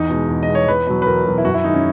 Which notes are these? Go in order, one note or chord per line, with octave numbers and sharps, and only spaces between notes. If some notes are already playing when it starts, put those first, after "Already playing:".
Already playing: E2 D#4
B2 G#3
E2
D#5
B2 G#3
C#5
E2 B4
B2 F#3
B4
E2 A#4
B2 F#3
E4
F#2 F#4
E4
D#3 G#3 D#4
C#4